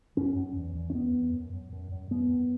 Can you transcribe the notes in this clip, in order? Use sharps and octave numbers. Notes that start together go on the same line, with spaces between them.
F#2 C#4
F#2
E2
E2
C#4
E2 B3
E2
F#2
F#2
F#2
F#2
F#2 B3
F#2